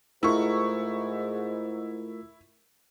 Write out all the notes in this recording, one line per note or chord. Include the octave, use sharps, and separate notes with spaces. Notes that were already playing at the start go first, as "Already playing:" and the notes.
G#2 A3 E4 F4 A#4 C#6